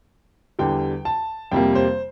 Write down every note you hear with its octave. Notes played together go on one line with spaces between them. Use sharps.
E2 D3 G3 G5
A5
F2 C3 G3 A#3 G5
C5